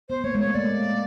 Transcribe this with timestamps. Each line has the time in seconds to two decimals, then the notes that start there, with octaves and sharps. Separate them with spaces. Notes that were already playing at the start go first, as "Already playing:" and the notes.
0.09 B3 C5
0.24 A#3 C#5
0.35 G#3
0.39 A3 C#5
0.54 A#3 D5